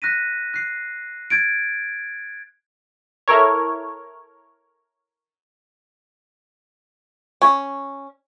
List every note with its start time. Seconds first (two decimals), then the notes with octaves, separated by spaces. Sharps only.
0.02 F#6 A#6 B6 D#7
0.54 F#6 C7
1.30 G#6 A6 D7
3.28 E4 A4 A#4 C#5
7.42 C#4